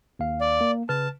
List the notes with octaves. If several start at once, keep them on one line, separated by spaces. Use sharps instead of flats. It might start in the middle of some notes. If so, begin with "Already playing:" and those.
D#2 F5
D5
A#3
C#3 B4 A5 F6